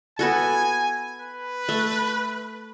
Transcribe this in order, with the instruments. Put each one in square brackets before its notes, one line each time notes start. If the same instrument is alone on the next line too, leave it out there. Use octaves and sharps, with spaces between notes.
[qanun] B3 F#4 A4 [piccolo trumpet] G#5
[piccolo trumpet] B4
[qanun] A3